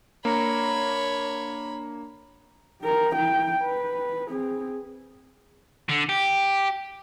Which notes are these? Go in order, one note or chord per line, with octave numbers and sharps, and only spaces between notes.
A#3 D4 C#5 A#5 B5 C#7
G4 A#4
E4 G5
B4
C4 G#4
D3
G4